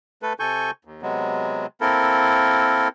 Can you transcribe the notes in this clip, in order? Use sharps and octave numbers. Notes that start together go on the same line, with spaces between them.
A3 A4 B4
C3 A4 G#5 C#6 G6
D#2
C3 F#3 G#3 B3
A#3 C4 E4 A4 A#4